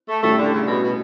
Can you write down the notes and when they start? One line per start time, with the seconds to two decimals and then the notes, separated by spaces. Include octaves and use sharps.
0.08 A3
0.23 A2 G3 A3 C#4 E4 G4
0.38 D3
0.52 C#3
0.68 B2
0.83 B2